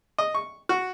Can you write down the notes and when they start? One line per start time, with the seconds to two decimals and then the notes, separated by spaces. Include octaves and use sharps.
0.18 D#5
0.34 C#6
0.69 F#4